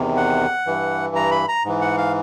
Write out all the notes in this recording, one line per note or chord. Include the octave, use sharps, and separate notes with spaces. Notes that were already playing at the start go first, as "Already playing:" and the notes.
Already playing: E2 C3 D#3
F#5
G2 E3
A#5
B5
A#5
G#2 E3
F#5
F5